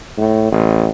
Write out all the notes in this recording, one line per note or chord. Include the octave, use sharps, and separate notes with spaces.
A2
A1